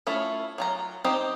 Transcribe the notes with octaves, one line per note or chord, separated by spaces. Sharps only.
A3 C#4 E4 F4
F#3 F4 A#5
C4 D#4 G4 D#5